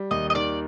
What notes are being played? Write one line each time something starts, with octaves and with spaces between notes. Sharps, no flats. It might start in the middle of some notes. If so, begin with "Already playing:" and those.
Already playing: G3
D#2 D#5
D#5
D#3 D5